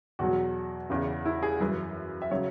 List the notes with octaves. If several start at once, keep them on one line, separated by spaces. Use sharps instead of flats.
E2 B2 F#3 F#4
E2 C#3 E3
E4
G#4
F#2 E3 B4
E5
C#3 F#3 C#5